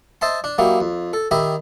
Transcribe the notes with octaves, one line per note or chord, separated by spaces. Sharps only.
C5 D#5 E5 A5 C6
D4
F#3 A#3 D#4 E4 G4
F2
A4
D#3 G4 D#5 E5 B5